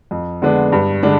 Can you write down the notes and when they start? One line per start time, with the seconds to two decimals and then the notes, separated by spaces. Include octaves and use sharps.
0.11 F2
0.42 D3 G#3 B3 D4
0.72 G2
1.03 D3 G#3 D4